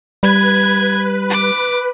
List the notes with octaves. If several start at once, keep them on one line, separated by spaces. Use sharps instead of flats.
G3 B4 G#6
D6